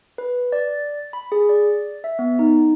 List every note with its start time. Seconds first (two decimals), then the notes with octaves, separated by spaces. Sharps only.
0.18 B4
0.52 D5
1.13 B5
1.32 G#4
1.49 D5
2.04 E5
2.19 B3
2.39 D#4